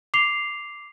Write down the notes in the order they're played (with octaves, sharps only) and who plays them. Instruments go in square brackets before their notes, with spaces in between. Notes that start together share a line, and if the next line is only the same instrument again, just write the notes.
[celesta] D6 C7 F7